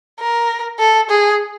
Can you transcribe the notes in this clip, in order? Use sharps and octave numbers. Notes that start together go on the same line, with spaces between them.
A#4
A4
G#4